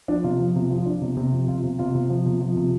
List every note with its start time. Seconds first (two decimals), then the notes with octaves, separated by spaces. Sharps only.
0.08 F3 D4
0.24 C3 F4
0.39 F3
0.56 C3
0.71 F3
0.78 F4
0.86 F3 D4
1.02 C3
1.17 C3
1.33 F3
1.48 C3 F4
1.63 C3
1.79 C3 F4
1.95 C3
2.10 F3
2.26 C3
2.41 F3
2.56 C3